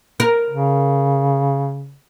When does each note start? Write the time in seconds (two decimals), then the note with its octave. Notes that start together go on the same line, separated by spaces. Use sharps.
0.20 A#4
0.50 C#3